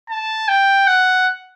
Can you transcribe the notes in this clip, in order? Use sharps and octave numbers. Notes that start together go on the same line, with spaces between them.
A5
G5
F#5